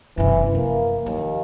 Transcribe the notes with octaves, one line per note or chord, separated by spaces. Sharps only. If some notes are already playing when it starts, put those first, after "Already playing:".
F#1 C3 E3
F3 A#3
D#2 F3